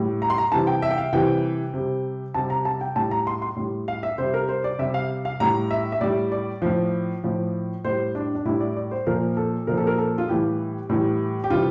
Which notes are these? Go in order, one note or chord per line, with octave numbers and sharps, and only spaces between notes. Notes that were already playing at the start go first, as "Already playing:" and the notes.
Already playing: A2 G3
A#5
C6
A#5
C3 E3 G3 A5
G5
E5
G5
F5
C3 E3 G3 G5
C3 G3
C3 G3 A5
A#5
A5
G5
A2 G3 A5
A#5
C6
C6
A2 G3
F5
E5
C3 G3 C5
A#4
C5
D5
C3 G3 E5
F5
F5
A2 G3 A#5
E5
E5
A2 G3 D5
D5
A2 F3
A2 F3
A2 G3 C5
D4
D4
A2 G3 E4
D5
D5
C5
A#2 F3 A#4
A4
A#2 F3 A#4
A4
A#4
A4
F4
A2 E3 G3 G4
A2 E3 G3
G4
C3 E3 G3 F4